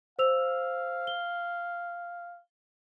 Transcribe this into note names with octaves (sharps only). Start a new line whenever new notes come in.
C5 F5 E6 F7
G7